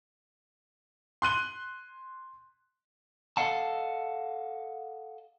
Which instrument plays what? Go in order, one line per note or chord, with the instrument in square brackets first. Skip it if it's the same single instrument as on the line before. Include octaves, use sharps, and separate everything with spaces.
[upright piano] C6 F#6 D#7 G7
[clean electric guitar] A4 D#5 F5 F#5 A5